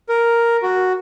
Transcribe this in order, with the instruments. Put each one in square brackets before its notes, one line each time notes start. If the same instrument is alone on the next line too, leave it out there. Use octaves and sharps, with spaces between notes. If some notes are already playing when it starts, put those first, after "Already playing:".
[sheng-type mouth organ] A#4
F#4